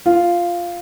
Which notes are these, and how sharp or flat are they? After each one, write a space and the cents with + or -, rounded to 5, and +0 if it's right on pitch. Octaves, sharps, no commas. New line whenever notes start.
F4 -5